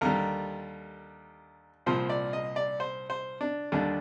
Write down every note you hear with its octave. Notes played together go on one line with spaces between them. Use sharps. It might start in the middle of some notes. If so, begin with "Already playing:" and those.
D#2 D3 G3 A#4
C2 A#2 F3 C5
D5
D#5
D5
C5
C5
D4
D#2 D3 G3 D4